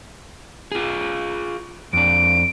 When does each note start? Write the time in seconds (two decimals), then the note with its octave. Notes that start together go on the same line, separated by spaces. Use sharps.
0.72 F4 G#4
1.93 F2 D4 D7